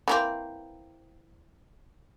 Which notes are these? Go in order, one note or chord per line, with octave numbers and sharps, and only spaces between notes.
E3 A#3 C4